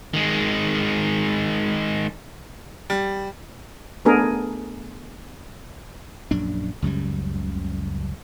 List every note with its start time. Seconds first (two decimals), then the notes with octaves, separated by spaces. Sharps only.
0.14 D#3 G#3
2.90 G3
4.05 A3 B3 D4 G#4 A#4
6.31 A#1 F#2 D4
6.82 C#2 F#2 C#3 G3